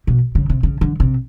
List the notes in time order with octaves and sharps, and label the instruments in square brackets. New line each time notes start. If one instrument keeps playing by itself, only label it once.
[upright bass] B2
C#3
C3
C#3
D3
C3